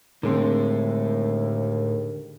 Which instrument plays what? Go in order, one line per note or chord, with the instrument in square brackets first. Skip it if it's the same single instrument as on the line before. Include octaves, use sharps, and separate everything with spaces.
[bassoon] D#2 [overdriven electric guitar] A2 [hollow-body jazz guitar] D3 G#3 C4